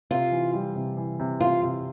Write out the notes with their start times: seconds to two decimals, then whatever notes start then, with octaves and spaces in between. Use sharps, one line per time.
0.10 C3 F4
0.32 E3
0.53 G3
0.75 C3
0.97 E3
1.19 C3
1.40 C3 F4
1.63 C3